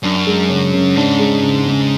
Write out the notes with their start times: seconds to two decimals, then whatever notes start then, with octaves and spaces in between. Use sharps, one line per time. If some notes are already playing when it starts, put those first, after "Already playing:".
0.03 F#2 D4
0.27 G#3
0.49 C#3
0.73 C#3
0.96 G#2 D4
1.19 G#3
1.43 C#3
1.66 C#3